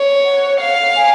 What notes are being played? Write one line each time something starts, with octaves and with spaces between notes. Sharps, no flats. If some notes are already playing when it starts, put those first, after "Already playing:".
Already playing: C#5
F#5
F5
G#5